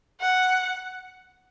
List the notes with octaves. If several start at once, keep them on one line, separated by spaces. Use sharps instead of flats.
F#5